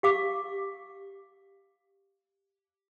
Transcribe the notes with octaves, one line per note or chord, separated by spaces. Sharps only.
G4 F5 D6